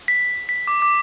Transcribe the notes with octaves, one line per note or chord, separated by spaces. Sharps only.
B6
B6
D6
D6